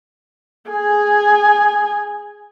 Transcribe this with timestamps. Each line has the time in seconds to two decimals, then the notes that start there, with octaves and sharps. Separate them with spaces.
0.70 G#4 G#5